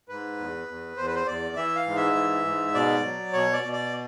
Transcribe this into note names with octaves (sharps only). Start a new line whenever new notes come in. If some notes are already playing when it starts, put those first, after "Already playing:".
G#2 B4
E2
E2
E2 C5
B4
C5
E2 D5
E3 E5
F5
G#2
E5
E3
G#2
B2 D5
F#3
B2 C#5
D5
B2
D5